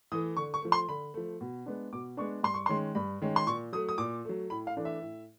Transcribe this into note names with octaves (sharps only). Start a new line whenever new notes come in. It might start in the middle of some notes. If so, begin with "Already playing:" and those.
E3 A3 D#6
D3 C#6
C#6
F3 A3
C6
D3 B5
F3 A3
B2
G#3 B3 D4
B2 D6
G#3 B3 D4 C#6
G2 C6
C#6
D#3 G#3 C#4 C6
G2 B5
D#3 G#3 C#4
C6
A#2 C#6
F#3 A3 D#6
D#6
A#2 D6
F#3 A3
A2 B5
F5
E3 A3 D4
E5
A2